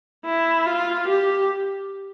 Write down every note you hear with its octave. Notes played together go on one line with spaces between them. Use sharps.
E4
F4
G4